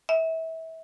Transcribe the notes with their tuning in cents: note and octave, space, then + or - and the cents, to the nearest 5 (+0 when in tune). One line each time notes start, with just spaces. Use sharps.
E5 -25